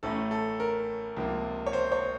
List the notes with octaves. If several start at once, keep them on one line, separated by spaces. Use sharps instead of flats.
A1 A2 A3 C#4 A4
A4
A#4
C#2 C3 F3 A#3
C#5
C5
C#5